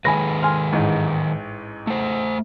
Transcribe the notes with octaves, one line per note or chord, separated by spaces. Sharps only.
D#3 G#3 B4 G#5 B5 A#6
G#5 C6 F6
A1 G#2
A3 C5